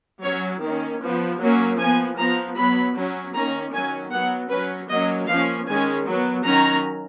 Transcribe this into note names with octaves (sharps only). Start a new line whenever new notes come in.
F#3 C#4 C#5
D#3 A#3 C#4
F3 B3
F#3 A#3 C#4
F3 B3 G#5
F3 B3 A#5
F#3 B3 B5
F#3 C#4
D#3 A#3 C#4 A#5
D#3 F#3 C#4 G#5
F#3 B3 F#5
F#3 C#4 B4
F#3 A#3 C#4 D#5
F3 A#3 C#4 F5
D#3 G#3 C#4 G#5
F#3 B3
D#3 F#3 C#4 A#5